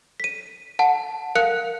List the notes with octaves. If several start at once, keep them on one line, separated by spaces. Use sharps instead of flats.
B6 D#7
F#5 A5
A#4 F5 F#6 C#7